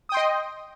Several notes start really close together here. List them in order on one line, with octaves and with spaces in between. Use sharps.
D#6 G5 C6 D#5